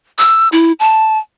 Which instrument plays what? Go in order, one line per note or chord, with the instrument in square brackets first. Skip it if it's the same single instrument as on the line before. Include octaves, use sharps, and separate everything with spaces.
[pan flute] E6
E4
A5